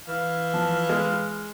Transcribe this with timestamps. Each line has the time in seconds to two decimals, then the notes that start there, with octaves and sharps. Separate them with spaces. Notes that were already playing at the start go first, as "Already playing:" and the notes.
0.08 E3 F5
0.54 F3
0.89 G#3